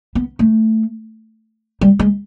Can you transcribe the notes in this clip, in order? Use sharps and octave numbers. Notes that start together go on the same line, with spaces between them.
B3
A3
G3
G#3